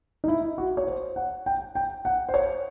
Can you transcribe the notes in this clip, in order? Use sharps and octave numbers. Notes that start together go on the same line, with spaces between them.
D#4
E4
F#4
C#5
C5
F#5
G5
G5
F#5
C5
C#5